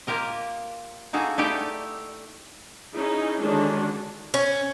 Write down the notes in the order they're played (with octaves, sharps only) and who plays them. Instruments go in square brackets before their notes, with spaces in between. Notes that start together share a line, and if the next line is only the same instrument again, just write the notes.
[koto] A#3 F4 G4 A#4 D#5
A#3 D#4 F#4 G#4 A4
A3 D#4 E4 G4 D5
[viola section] C#4 D#4 E4 G#4
D3 D#3 G#3 C#4 D4 F#4
[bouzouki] C#4